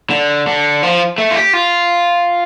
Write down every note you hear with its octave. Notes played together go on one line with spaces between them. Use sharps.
D3
D3
F3
A3
F4
G4
F4